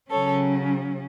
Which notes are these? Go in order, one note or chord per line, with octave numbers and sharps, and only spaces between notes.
C#3 F#3 C#4 A4 C#5